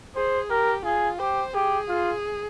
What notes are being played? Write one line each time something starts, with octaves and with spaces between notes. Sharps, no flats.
G#4 C5
G4 A#4
F4 G#4
G4 C5
G4 G#4
F4